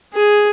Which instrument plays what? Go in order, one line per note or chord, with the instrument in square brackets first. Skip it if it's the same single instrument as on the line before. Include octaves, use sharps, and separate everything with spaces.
[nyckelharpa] G#4